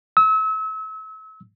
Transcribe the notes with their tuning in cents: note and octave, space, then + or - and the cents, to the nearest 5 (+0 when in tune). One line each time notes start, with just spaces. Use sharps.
E6 -35